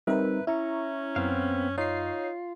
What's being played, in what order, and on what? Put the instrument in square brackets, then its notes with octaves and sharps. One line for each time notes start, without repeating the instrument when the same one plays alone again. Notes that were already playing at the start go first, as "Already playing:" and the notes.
[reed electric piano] G3 C4 D#4 [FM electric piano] A#4 E5 [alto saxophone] B4
[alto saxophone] C#4 [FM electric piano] E4 A#5 C#6 [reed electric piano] E5
[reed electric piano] F#2 [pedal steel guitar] B3 C4 F5
[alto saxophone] D#4 [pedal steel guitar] F4 [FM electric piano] C#5 C7